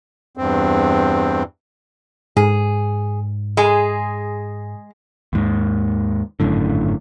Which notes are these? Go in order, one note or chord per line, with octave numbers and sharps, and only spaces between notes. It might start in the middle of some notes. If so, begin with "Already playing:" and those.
E2 G2 C4
G#2 G#4
G#3 G#4
D#2 G#2 D#3
G#1 F#2 A2 D3